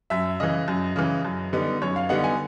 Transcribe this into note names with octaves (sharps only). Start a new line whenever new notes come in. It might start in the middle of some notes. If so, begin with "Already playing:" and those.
F#2 E5
C#3 E3 D#5
F#2
C#3 E3
F#2
D3 G3 B3 D#4
F#2 C#5
F5
D3 G3 B3 D#4 F#5
G#5